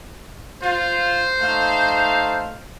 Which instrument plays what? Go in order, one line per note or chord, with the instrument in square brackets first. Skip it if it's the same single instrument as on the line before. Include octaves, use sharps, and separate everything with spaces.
[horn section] F4 [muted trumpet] C5
[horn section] A3 D#4 F5